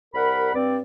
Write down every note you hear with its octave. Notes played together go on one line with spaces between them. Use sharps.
C2 G3 A#4 F#5 B5
G2 C4 D5